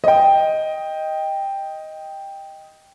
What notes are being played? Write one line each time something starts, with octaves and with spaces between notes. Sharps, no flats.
D#5 G5